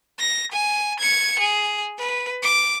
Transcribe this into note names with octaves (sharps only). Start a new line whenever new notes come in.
A#6
G#5
G#6 C#7
G#4
B4
D6